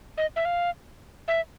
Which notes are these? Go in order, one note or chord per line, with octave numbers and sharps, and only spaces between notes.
D#5
E5
F5
E5